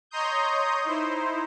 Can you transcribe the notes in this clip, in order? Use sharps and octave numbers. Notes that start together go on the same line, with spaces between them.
C#5 D#5 A#5 C6 D#6 G6
D#4 E4 C5